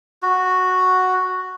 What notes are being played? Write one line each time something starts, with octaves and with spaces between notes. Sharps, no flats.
F#4